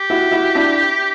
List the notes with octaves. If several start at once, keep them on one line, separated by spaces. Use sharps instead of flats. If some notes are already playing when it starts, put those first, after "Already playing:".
Already playing: G4
E4 F#4
E4 F#4
D4 E4